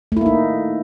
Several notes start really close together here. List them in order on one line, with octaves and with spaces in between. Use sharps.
A3 E4 A#3 D#4